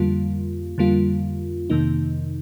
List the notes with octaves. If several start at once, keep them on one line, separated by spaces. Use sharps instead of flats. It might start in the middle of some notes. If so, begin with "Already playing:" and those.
Already playing: F2 D3 G3 A#3 F4
F2 D3 G3 A#3 F4
F2 C3 D#3 A#3 D#4